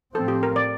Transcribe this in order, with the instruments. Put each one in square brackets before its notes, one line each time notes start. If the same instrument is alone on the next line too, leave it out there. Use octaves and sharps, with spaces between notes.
[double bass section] A2 F3 C4 [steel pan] A4
[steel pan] G4
A#4
D5